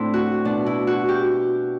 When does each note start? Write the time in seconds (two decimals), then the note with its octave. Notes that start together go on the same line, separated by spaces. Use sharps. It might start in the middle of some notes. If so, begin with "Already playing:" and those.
Already playing: A2 C4 D4 E4
0.14 F#4
0.45 B2 D4
0.66 E4
0.87 F#4
1.09 G4